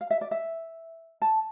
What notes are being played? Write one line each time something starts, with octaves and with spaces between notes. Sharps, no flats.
F5
E5
D5
E5
A5